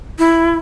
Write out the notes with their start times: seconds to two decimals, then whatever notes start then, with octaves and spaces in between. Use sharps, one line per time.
0.19 E4